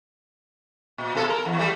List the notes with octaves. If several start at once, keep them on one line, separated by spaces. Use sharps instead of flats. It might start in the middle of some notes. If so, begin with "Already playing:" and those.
A#2
B2 A4
A#4
E2
G3 A3